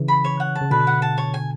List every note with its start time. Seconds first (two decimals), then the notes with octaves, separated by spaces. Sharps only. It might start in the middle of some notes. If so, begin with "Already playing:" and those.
Already playing: C#3 E3
0.08 B5
0.25 C#5
0.40 F#5
0.55 A5
0.61 C#3
0.71 B2 D3 B4
0.87 F#5
1.02 A5
1.18 C#5
1.34 G#5